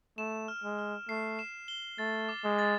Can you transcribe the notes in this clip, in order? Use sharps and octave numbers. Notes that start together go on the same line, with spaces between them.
A3 E7
F6
G#3
F6
A3 C7
E7
G7
A3 A6
D6
G#3
A6